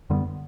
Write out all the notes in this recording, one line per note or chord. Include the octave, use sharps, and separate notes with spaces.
F#2 D3 G3 B3